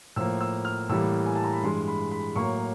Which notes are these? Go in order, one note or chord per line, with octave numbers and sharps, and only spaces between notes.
A2 F3 A#3 E6
E6
F6
A2 E3 G3 A#3 E6
G#5
A5
A#5
B5
G2 E3 G#3 C6
B5
B5
A2 F#3 A#3 C#6